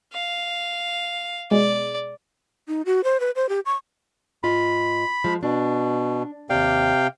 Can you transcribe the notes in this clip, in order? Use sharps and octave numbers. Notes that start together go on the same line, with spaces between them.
F5
B2 G#3 D5
D#4
F#4
C5
B4
C5
G4
C#6
G#2 F4 D#5 B5
F3 G#3
B2 D4
D#2 C3 D5 F5 G5